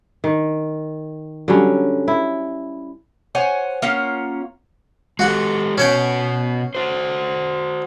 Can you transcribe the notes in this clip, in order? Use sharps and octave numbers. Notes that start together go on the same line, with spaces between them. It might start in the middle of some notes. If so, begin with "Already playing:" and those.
D#3
D3 F#3 G3 C#4
E4
C5 C#5 F#5 G#5
A#3 C#4 F4 F#5
G#3 F#4 G4 A4 F#5
B2 C#4 F#4 C#5 G5
F#4 C5